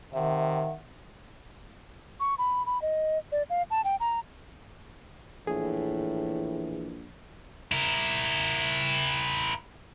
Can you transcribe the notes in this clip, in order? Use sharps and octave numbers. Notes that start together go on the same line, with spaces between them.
C3 D#3 E5 F#5
C#6
B5
B5
D#5
D5
F5
A5
G5
A#5
A#1 A2 E3 G#4
E4 A#4